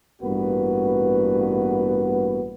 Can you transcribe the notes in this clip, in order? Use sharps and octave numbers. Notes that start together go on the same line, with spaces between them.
A1 G2 A#3 B3 F#4 B4